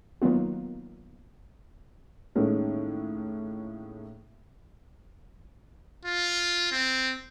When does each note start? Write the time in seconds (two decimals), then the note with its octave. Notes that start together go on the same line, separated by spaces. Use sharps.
0.22 D#3 F#3 A#3 B3 F4
2.35 A2 D#3 G#3 A#3 C#4 A4
6.05 F4
6.72 C4